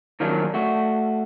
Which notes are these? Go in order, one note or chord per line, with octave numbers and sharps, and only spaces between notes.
D#3 F3 F#3 A#3 C#4 D4
A3 F#4